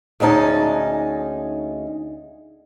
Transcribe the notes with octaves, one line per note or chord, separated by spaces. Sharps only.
D2 G#3 C#4 D#4 A5